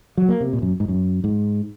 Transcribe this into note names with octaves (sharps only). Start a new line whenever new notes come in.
F#3
A#3
C3
A#2
F#2
G#2
F#2
G#2